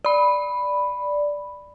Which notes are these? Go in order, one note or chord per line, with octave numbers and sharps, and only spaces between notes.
D5 B5